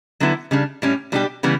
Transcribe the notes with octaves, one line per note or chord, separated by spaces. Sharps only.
D3 F#3 B3 E4
C#3 G3 D4
A2 G3 C#4
B2 G3 D4 G4
C#3 E3 G3 B3